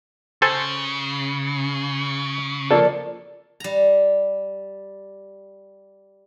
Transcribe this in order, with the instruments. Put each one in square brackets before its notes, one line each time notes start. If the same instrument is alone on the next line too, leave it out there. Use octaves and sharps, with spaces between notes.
[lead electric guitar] C#3 [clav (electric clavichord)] A4 C5 G#5
[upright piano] F3 A#3 A4 [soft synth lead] D5
[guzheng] G3 A#5